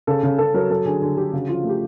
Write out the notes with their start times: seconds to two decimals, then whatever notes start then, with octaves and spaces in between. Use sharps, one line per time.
0.07 C#3 A4
0.23 C#3
0.38 C#3 A4
0.54 F#3 A#4
0.70 F#3 A4
0.85 D3 G#4
1.02 D3 G#4
1.17 D3 G4
1.33 C#3 F#4
1.48 F3 F4
1.64 A3 G4